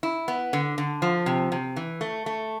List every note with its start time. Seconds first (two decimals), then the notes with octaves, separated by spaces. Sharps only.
0.03 E4
0.28 B3
0.53 D3
0.78 D3
1.02 F3
1.26 C3
1.52 C3
1.76 E3
2.01 A3
2.26 A3